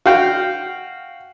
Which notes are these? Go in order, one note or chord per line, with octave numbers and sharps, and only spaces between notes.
F#4 F5 G5